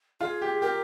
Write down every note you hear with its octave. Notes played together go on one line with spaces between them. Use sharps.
F4 G#4
G4
G4 A#4